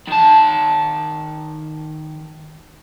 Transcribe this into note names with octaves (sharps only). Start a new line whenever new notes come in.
D#3 A5